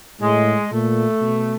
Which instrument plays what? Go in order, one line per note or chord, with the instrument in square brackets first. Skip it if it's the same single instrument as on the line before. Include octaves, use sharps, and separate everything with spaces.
[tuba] A2 [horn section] G#3
[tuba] A#2 [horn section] A3
[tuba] B2